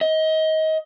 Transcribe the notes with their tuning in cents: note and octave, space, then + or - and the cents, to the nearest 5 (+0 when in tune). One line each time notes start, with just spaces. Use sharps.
D#5 +25